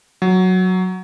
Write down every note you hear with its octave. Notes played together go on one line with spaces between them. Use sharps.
F#3